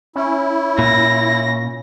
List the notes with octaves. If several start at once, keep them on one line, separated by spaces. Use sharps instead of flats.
C#4 E4
A#2 A#6